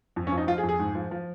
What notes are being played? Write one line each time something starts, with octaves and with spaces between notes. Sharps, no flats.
F2
C#4
F3
D#4
F3 F4
G#4
F2
G#4
G#2
F3
F3